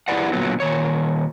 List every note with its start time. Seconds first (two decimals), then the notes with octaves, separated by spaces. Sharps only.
0.08 E4 G4 G#4 B4 D5 F#5
0.33 A#2 D3 F#3 B3
0.60 A#2 D#3 C#5